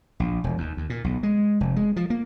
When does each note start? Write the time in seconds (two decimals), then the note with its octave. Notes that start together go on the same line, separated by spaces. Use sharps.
0.20 A#1
0.44 E1
0.58 D#2
0.77 D#2
0.90 A#2
1.04 B1
1.23 G#3
1.61 F1
1.76 G#3
1.96 F3
2.10 A#3